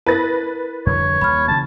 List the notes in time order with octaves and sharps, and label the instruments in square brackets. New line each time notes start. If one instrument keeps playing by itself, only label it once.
[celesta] E4 A#4 [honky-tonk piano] B4 A6 A#6
[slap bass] F2 D3 G3 [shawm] C#5
[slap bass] D#2 G3 [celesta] B5 F6
[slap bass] C#3 E3 A#3 [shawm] A5